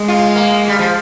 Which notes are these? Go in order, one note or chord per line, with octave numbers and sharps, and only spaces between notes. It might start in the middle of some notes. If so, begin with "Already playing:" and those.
Already playing: G#3
F4
A#3
G3
F3